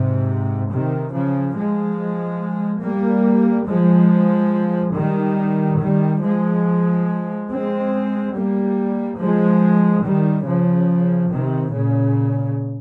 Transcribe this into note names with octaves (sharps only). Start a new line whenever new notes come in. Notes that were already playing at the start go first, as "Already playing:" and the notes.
Already playing: G#2 C3
C3 D#3
C#3 F3
F3 G#3
G3 A#3
F3 G#3
D#3 G3
D#3 G3
F3 G#3
G#3 C4
G3 A#3
F3 G#3
D#3 G3
C#3 F3
C3 D#3
A#2 C#3